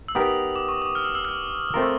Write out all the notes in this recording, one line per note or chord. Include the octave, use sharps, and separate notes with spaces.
E6
B3 D#4 G4 A#4 D#6
D6
C#6
D6
F6
E6
E6
F6
A3 C4 F4 A#4